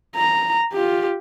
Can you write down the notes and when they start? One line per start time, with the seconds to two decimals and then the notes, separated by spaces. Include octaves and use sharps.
0.16 A#5
0.73 F4 G4